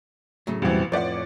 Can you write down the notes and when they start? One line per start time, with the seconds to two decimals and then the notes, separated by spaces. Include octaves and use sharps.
0.47 A2 C#3 F#3 A3
0.62 A#1 E2 B2 E3 G3 C4 E4
0.92 F2 A2 F3 B4 C#5 D5 E5 F#5